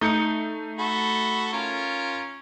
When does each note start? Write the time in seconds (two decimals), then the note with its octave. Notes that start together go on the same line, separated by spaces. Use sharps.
0.01 A3 D#4 D#6 G6 C#7
0.79 F#4 A4 B5
1.53 C#4 F4 A#4